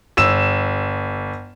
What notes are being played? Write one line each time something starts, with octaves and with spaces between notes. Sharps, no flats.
G1 E6 E7